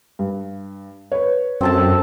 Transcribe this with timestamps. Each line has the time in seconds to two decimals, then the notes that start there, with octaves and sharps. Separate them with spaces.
0.19 G2
1.12 B4 C#5
1.61 F#2 C4 A4 A5